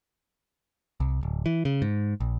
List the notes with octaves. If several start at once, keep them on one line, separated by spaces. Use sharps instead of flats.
C2
D1
E3
C#3
G#2
A#1